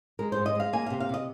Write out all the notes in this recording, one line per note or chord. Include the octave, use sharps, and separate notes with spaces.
G#3 A#4
G#2 C5
D#5
G#3 F5
A#3 G#5
C3 F5
F5
C3 D#5